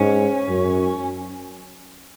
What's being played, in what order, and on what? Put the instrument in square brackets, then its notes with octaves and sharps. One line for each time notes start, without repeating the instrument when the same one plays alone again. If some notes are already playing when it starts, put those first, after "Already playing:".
Already playing: [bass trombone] G#2 [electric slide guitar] C#4
[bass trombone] F#2